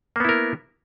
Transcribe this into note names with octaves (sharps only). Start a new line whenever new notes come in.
A#3 B3 E4 A#4